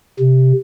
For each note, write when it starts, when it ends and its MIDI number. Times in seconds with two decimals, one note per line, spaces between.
0.20 0.53 48